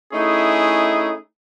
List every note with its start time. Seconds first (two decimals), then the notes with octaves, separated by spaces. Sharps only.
0.12 A3 C#4 D#4 E4 G#4